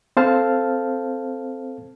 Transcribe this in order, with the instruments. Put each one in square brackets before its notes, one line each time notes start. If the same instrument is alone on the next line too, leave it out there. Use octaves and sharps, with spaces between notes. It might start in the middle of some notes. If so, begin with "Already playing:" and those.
[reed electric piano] C4 A4 C5 F5 A5 F6